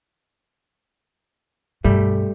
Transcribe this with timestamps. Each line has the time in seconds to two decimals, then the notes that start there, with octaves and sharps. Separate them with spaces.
1.84 G2 B2 G3 A3